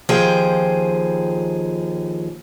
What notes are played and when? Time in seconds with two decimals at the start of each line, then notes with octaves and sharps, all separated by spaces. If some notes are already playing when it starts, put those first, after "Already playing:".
0.09 D#2 F3 G#4 C5 G5